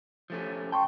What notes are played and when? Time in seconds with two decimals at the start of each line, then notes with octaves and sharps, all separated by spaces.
0.30 F3 A3 C#4
0.72 G5 A5 C6 C#6